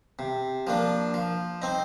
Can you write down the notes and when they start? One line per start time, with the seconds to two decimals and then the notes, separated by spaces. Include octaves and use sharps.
0.19 C3
0.67 F3 A#3 D4
1.14 F3
1.62 C4 D#4